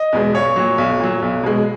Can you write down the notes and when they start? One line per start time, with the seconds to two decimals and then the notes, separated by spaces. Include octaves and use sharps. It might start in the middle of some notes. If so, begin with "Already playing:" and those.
Already playing: D#5
0.13 E2 B2 G#3
0.35 B1 C#5
0.56 A#2 F#3
0.78 B1
1.00 A#2 F#3
1.22 B1
1.43 B2 G#3